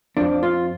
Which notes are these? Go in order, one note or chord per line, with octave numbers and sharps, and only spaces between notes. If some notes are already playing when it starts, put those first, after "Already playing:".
F2 F3 D4
F4